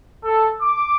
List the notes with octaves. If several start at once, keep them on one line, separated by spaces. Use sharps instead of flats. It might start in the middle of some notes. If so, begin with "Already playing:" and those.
A4
D6